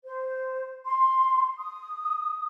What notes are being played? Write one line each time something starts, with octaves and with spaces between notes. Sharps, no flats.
C5
C6
D#6